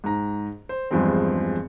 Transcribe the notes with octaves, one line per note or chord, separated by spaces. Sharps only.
G#2 A#5
C5
E2 G2 F3 G#3 C4